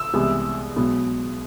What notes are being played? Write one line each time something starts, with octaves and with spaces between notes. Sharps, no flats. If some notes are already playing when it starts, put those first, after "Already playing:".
Already playing: E6
C2 C3 E3 G#3 B3
B1 B2 G#3 B3